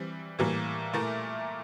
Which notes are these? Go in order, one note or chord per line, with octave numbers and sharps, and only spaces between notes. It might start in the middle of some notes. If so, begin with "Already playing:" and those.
Already playing: E3 G3 C4
A2 E3 G3 A#3
A#2 A3 E4 A#4